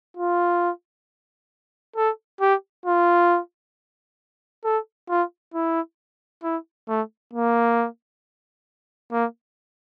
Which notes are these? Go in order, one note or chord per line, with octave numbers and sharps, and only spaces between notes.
F4
A4
G4
F4
A4
F4
E4
E4
A3
A#3
A#3